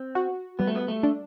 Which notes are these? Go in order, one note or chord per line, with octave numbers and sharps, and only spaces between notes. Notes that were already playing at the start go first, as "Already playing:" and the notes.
Already playing: C4
F#4
G3 B3
A3
B3
A3
D4